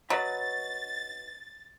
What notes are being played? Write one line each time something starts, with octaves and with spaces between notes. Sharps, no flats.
F#3 B4 D#5 B5 A6